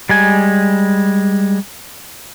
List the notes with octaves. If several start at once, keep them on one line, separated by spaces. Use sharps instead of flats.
G3 G#3 G#5